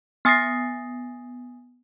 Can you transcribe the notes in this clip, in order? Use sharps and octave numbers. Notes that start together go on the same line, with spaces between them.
B3 G#5 D#6 A6 A#6 C7